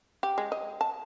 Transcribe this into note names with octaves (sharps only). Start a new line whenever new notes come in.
G4
G#3
D#5
A5